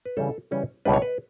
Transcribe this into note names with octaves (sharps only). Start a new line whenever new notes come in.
B4
C#3 E3 G3 C#4 A4
C#3 E3 G3 C#4
C#2 B2 G3 D4 B4
C#5
B4